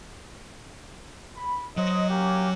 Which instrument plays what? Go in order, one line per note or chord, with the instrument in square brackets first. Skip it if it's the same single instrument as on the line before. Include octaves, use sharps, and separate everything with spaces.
[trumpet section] B5
[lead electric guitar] F#3 C#5 [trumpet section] C5 D#5
[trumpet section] A#3 C#4 G4